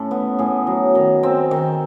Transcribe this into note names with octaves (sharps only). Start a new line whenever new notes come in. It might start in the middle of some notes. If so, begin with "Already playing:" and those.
Already playing: A2 C#4 A4
B3
A2 G#4
F#3
D#3
C4
D#3